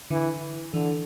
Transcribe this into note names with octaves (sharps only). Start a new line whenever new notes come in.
D3 E3
D3 E3